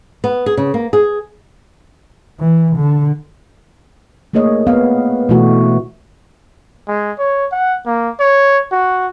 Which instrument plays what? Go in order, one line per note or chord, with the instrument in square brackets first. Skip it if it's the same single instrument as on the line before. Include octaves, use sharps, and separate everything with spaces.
[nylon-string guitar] B3
G#4
C#3
A#3
G#4
[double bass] E3
D3
[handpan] A3 A#3 G#4 C#5 D#5
B3 C4 F5
B2 E3 A3 F#4
[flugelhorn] G#3
C#5
F#5
A#3
C#5
F#4